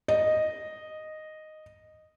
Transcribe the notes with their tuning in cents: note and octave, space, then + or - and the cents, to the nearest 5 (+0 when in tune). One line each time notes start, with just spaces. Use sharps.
D#5 -5